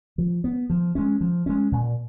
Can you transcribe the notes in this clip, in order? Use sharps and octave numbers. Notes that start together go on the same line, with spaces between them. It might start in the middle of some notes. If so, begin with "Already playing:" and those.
F3
B3
F3
G#3 C#4
F3
G#3 C#4
A#2